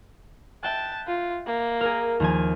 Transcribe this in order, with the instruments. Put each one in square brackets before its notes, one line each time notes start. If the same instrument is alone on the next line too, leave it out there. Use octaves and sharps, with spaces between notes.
[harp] E5 G5 F#6 [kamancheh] A5
[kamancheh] F4
A#3
[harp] G#4 A#4
D#2 F3 G#5